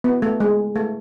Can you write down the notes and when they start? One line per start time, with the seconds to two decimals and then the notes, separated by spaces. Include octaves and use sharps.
0.04 B3
0.22 A3
0.40 G#3
0.76 A3